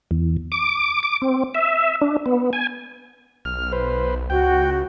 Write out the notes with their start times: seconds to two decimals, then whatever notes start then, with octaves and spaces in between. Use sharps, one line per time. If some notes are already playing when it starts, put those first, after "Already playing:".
0.11 E2
0.52 D6
1.03 D6
1.22 C4
1.55 E5
2.02 D4
2.26 B3
2.53 G#5
3.45 B1 F6
3.72 B4 C5
4.30 C#2 F#4 G5